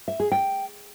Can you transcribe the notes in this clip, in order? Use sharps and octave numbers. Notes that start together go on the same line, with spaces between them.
E5
G#4
G5